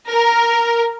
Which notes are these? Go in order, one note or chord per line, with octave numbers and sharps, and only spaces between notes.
A#4